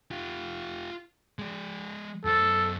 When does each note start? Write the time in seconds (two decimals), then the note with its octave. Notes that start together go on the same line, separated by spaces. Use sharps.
0.11 F4 G4
1.39 G#3 D5
2.25 F#2 A4 C5